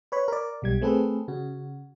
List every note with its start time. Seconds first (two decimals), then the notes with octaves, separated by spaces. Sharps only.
0.12 B4 C#5 B5
0.28 A#4 D5
0.62 B1 G3 G#6
0.81 A3 C4 G#4 A4 B4
1.28 C#3 F#4